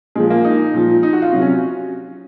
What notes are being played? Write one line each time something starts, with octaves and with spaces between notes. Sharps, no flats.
A#2 F3 G#3
A#3
D#4
A#2 F3
D#4
F#4
F4
C3 F#3
C#4